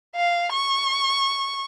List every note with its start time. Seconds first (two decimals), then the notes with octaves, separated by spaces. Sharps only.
0.16 F5
0.52 C#6